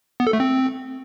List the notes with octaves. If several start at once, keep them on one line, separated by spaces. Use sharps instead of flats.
B3
A4
A3
C4